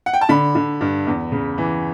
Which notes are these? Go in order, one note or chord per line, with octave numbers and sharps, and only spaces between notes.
F#5
G5
A5
D3 B5
D3
G2
E2
C#3
E3